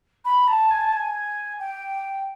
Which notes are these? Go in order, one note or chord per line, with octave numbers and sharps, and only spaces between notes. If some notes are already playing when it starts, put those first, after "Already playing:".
B5
A5
G#5
A5
G#5
G5